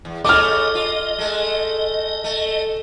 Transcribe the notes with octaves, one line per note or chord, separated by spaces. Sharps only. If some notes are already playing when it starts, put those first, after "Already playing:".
E2
C#3 A3 D#5 D6 F6
F4
G#3 A3
A3